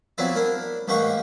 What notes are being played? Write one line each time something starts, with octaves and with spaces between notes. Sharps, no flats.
F3 F#3 B3 C4 E4 D5
D4 E4 A#4
A1 G#2 A#3 G4 F#5 C#6